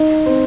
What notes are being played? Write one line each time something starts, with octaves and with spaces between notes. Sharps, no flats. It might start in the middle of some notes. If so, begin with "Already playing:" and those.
Already playing: D#4
C4